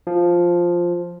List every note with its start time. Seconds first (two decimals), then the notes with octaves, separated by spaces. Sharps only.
0.07 F3